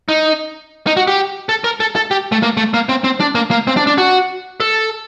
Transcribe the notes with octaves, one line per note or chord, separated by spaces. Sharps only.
D#4
D#4
F#4
G4
A4
A#4
A4
A4
G4
A3
A#3
A3
A#3
C4
C4
D4
A#3
A#3
C4
D4
D4
F#4
A4